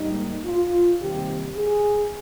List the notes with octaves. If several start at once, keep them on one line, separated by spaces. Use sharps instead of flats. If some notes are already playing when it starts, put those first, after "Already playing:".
Already playing: G#2 G3 A#3 D#4
F4
C3 D#3 G3 A#3 G4
G#4